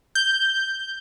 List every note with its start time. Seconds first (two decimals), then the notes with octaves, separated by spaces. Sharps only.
0.15 G6